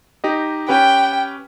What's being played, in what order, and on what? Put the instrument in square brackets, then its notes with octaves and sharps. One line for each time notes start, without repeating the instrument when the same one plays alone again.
[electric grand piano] D#4 G4 D#5
[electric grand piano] C#4 G4 B4 [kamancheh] G5